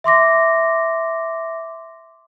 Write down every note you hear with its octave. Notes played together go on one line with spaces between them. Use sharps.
E5 C6 D6 A#6